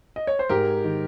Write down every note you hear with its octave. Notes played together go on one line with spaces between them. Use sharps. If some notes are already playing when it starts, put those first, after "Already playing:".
D#5
C#5
C5
G#2 G4 A#4
D#3